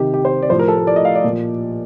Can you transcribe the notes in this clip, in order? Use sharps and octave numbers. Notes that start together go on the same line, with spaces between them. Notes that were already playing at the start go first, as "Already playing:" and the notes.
Already playing: C3 D#3 G4
G4
C5
D5
A2 F3 C5
A#4
A4
A#4
D5
D#5
F5
D5
A#2 F3